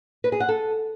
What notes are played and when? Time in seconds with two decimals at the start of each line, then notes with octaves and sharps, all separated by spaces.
0.24 B4
0.32 G#4
0.40 F#5
0.49 A4